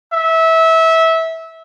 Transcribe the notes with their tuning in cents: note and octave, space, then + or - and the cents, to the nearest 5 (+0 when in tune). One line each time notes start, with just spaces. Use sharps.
E5 -20